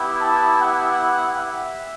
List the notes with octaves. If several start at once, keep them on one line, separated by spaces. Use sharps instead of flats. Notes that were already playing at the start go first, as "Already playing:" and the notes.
Already playing: B3 E4 G4
A5
F#5
E5